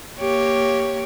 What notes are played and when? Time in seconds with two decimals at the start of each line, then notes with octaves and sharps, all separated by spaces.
0.19 A#3 G4 C#5